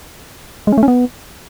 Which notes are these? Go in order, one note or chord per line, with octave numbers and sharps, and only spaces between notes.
G#3
C#4
A3
C#4
B3